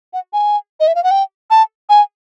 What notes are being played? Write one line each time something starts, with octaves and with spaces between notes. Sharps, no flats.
F#5
G#5
D#5
E5
F5
F#5
G5
A5
G#5